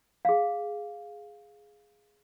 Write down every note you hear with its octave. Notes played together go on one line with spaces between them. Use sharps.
G#4 F5